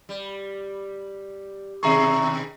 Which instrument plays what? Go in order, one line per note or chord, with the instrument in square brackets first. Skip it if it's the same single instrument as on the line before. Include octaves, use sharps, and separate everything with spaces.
[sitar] G3
[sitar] B2 D#3 G#4 [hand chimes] E5 A#5 C#6